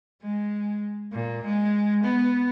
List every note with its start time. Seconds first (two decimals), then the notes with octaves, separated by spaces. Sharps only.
0.22 G#3
1.13 A#2
1.45 G#3
2.04 B3